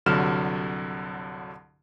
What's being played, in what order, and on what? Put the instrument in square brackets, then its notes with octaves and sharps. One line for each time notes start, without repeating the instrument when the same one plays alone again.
[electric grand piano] C2 G2 D3 F#3 F6 E7